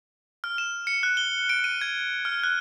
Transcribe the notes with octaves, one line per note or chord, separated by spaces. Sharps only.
F6
E7
C#7
F#6
G7
D7
D#7
G#6
F6
F#6